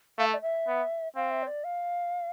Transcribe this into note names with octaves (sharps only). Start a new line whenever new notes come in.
A3 F5
E5
D5
E5
B3
C4 F5
E5
C5
D5
F5